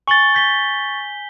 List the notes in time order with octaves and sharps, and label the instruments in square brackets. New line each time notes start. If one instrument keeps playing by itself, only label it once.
[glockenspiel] G#5 F#7 G7 [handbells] C#6 A6
[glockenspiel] G6 B6 G7